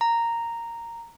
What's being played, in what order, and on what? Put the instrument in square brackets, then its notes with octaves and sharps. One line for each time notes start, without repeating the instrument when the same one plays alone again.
[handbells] A#5